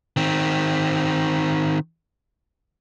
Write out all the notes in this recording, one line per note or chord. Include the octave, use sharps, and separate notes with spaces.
D#3 C4